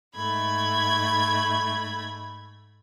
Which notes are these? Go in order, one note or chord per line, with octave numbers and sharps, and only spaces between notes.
G#2 A3 B5 G#6